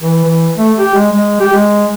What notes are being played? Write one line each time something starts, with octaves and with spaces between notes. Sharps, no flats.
E3
E3
A3
G4
G#3
G#3
G4
G#3